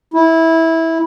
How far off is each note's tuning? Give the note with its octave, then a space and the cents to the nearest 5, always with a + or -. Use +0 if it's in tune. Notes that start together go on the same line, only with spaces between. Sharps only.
E4 -15